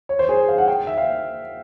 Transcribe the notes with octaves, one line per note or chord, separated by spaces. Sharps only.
C#5
C5
G#4
F5
F#5
G5
E5
F5